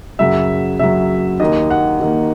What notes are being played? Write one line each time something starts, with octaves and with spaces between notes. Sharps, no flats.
F#2 C#3 F#3 E5
F#2 C#3 F#3 E5
D#2 D#3 A#3 D#5
F#5
D#2 D#3 A#3